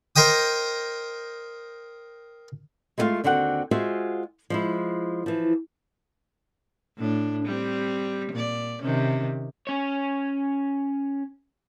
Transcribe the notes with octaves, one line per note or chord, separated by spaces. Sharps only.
A#4 C5 D#5 G5 D#6
G#3 A3 E4 F4 F5
D#2 D3 C4 F#4 F#5
G#3 F4 F#4 G#4 C5 E5
F3 G#3 E4
E3 F3
A2 D4
G3 C4
A#2 D5
C3 D#3 C#4
C#4 C#5